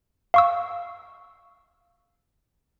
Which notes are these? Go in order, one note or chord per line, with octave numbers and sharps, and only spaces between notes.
F5 C#6 E6